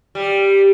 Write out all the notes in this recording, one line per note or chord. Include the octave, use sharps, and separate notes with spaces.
G3